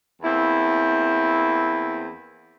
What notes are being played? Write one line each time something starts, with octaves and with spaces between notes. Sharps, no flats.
E2 A#3 C4 E4